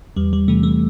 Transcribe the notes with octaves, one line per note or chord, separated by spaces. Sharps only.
E2 G3
G3
C3 E3 A3
A3